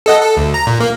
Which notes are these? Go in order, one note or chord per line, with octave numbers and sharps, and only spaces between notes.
A4 D#5 F#5
A4
D2
A#5
A#2
A#3